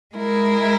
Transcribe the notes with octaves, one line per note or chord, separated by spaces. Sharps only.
G#3 E4 A#4